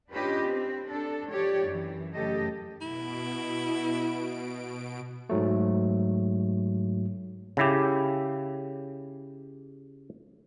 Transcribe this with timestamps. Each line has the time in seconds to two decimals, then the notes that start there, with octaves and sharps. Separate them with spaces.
0.12 C#4 D4 F4 G4 B4 D#5
0.46 C4
0.88 D4 A4
1.30 F3 G4 C#5 D5
1.63 F#2 E3
2.15 F#2 C#3 A3 G4 A4 D#5
2.81 B2 E4 D7
5.30 G#2 F#3 A3
7.57 C#3 E4 G4